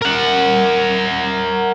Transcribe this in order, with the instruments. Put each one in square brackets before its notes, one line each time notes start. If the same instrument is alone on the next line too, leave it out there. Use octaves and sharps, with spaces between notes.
[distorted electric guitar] A#4 F#5